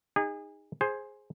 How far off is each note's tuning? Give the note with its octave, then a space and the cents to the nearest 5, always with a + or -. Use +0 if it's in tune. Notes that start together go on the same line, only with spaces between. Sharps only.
D#4 +0 G#4 -30
G#4 +5 C5 +15